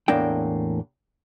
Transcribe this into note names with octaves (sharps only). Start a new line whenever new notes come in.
E2 A2 A#3 D4 G5